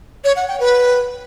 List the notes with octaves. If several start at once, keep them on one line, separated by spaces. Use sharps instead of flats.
C#5
F#5
G5
B4